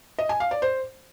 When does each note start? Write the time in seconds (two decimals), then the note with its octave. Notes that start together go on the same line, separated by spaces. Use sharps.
0.19 D#5
0.29 G#5
0.40 F5
0.51 D5
0.62 C5